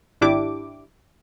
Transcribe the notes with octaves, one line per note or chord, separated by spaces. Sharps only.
G#1 D4 E4 G4 D6